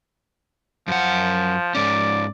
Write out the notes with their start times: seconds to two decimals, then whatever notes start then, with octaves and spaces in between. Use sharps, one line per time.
0.88 F#2 F3 F#5
1.75 G#2 C#4 D5